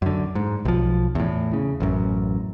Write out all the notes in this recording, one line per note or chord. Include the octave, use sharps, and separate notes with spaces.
F#2 D3
G#2
B1 F3
E2 A2
C#3
A1 F#2